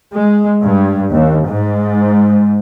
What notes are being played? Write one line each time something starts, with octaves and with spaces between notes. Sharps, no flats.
G#3
G2
D#2
G#2